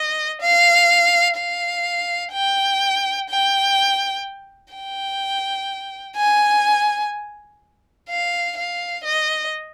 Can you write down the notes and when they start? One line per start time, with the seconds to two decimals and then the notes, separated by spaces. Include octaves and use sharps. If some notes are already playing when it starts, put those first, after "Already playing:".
Already playing: D#5
0.41 F5
1.38 F5
2.33 G5
3.30 G5
4.74 G5
6.17 G#5
8.09 F5
8.57 F5
9.04 D#5